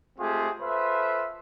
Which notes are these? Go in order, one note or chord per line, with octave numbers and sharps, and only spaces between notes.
G#3 A3 C4 F4 G4 G#4
F4 A4 B4 C5 E5